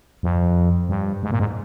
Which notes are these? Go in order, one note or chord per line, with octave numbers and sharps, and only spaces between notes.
F2
G2
G#2
A#2
G#2